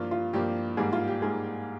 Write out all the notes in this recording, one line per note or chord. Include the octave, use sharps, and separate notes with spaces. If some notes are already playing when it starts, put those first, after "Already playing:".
Already playing: G2 F3 A#3 F4
F4
G2 F3 A#3 G4
G#2 G3 A#3 G#4
F4
G4
G#2 G3 A#3 G#4